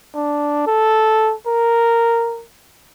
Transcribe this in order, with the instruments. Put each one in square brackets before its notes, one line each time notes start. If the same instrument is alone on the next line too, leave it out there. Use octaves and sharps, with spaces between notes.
[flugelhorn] D4
A4
A#4